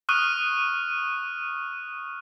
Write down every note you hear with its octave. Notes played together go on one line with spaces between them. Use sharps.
C#6 D#6 F6 F#6 D#7